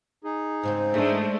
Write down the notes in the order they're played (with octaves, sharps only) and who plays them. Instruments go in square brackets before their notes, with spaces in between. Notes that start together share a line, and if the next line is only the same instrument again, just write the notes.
[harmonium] D#4 G#4
[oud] G#2 C#3 C4 [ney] C5
[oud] G#2 E3 [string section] G#3 A3 D4